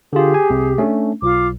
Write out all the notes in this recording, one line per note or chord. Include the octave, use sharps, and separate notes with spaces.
D3 F4 G4 G#4
G#5
C2 C3
A3 C#4 D4
B1 F4 D6